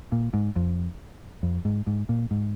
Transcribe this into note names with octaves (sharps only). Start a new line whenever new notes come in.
A#2
G#2
F2
F2
G#2
G#2
A#2
G#2